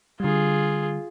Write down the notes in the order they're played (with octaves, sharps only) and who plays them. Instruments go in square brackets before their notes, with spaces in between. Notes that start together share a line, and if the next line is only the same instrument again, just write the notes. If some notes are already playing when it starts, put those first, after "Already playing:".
[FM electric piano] D3 G3 [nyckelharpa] F4 G#4